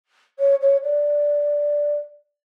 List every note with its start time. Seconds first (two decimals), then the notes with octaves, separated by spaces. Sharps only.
0.39 C#5
0.61 C#5
0.83 D5